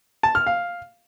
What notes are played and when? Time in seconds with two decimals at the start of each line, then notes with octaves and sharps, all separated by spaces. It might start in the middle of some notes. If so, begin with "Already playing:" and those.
0.23 A5
0.35 F6
0.47 F5